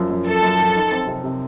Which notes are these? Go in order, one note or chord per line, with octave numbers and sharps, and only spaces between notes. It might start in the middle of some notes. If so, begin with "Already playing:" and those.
Already playing: F#2 F3
F#2
F#2 A4
F#2
F3
D#4
C4
C3
C3